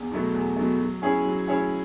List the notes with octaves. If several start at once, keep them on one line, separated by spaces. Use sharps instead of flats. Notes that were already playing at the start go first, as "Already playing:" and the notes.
Already playing: E2
B2 F#3 A3
E2
B2 F#3 A3
F#3
C#4 E4 G#4 C#5
F#3
C#4 E4 G#4 C#5